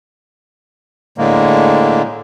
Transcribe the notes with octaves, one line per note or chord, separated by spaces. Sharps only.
A2 D3 G#3 A#3